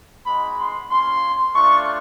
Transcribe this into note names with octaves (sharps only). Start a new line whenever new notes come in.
G#3 B3 D#4 F#4 B5
C6
A#3 C#4 F4 C6
A3 D4 F4 C#6